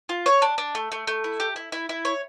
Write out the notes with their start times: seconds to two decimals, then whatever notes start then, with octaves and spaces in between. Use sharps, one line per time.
0.09 F4
0.26 C#5
0.42 D4
0.58 D4
0.75 A3
0.92 A3
1.07 A3
1.24 E4
1.40 G4
1.56 E4
1.72 E4
1.89 E4
2.05 C#5